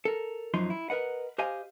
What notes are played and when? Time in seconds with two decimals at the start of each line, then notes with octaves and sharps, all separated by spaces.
0.05 A4 A#4
0.54 F#2 F3 D#4 C6
0.70 E4
0.90 A#4 B4 D#5 F#5
1.38 G4 C5 D#5 F5 G#5